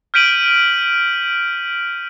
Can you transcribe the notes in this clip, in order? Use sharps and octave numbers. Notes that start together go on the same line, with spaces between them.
F6 G6 B6 D7 D#7 F#7